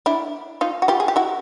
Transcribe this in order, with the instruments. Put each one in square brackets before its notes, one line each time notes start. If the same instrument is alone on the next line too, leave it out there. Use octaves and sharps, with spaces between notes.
[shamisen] D4 E4
D#4 F4
F#4
F4 G4
G#4
G4
E4 F#4